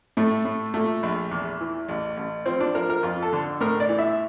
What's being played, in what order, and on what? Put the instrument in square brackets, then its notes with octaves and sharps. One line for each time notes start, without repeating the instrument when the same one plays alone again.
[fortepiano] A2 A3
A2
A#2 A3
A#1
E2
E3
A1
A1
F3 C4
D4
F3 A#4
A#4
F2 F4
A4
D3
A2 A#4
D5
E3
E5